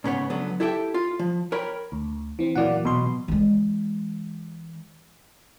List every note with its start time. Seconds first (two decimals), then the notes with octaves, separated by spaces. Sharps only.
0.04 G#2 C#3 B3 C#5
0.30 C#2 D3 F#3 B3
0.60 E4 G4 A4 E5 G5
0.94 F4
1.19 F3
1.52 A#4 C#5 G5 B5
1.92 D2
2.39 E3 C4
2.56 A#2 E3 F#3 A#3 D5 F#5
2.85 B2 C6
3.28 E3 G#3